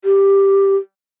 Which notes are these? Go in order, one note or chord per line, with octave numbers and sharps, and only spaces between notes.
G4